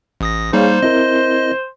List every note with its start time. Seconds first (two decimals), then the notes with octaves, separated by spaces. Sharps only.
0.21 A1 D#6 A#6
0.53 G3 A#3 D#4 G#4 C5 C#5 F5
0.83 C4 E4 A#4 D#5